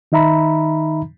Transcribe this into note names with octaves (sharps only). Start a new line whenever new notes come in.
D#3 D#4 E5 A#5 B5